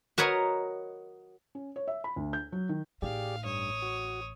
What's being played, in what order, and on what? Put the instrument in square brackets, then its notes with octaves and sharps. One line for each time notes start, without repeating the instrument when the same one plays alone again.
[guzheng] F#4 A#4 B4 C#5 D#5
[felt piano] C#4
C#5
E5
B5
D2
G6
F#3
D#3
[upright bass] A1 D#4 [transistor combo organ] G4 G#4 D5 [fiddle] F5
[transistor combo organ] G2 [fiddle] C#5 [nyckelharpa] D#6
[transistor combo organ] F#4